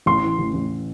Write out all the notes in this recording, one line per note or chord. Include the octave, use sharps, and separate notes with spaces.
A1 C6
E3
A1
A1